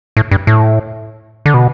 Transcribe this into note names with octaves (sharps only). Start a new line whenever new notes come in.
A2
G2
A2
D3
B2